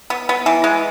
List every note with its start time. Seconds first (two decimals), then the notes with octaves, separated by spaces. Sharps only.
0.10 B3
0.29 B3
0.46 E3
0.64 G#3